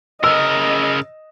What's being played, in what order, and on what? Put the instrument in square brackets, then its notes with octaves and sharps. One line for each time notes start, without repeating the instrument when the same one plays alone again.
[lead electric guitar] C#3 A#4 [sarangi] D#5 [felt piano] E6